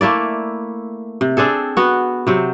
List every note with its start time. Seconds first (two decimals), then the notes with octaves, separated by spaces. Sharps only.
0.01 A3 A#3 E4 D5
1.21 C3
1.37 C4 D4 G#4 A4
1.77 B3 F#4
2.27 C3 F#3 C4